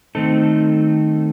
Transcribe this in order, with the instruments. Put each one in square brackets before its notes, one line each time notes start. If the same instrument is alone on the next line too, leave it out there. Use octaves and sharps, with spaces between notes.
[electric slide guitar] D#3 A3 C4 D#4 A4